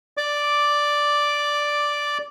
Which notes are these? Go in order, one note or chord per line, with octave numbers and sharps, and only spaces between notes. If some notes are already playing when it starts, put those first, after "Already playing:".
D5 D6